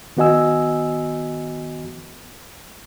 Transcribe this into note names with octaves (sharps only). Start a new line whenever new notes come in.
D#3 B3 F#4 D#5 G#5 E6